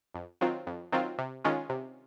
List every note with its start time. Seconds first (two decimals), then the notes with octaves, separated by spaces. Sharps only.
0.15 F2
0.41 D#3 F#3 C4 F4
0.67 F2
0.92 D#3 F#3 C4 F4
1.18 C3
1.45 D#3 G#3 C#4 F4
1.70 C3